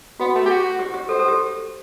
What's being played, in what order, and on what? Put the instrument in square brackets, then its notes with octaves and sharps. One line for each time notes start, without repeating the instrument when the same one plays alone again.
[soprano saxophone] B3 [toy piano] F#4
[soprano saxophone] A3
G4
F#4
[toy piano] G4
G4
[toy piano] A4 [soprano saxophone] C5
[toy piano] A4
G4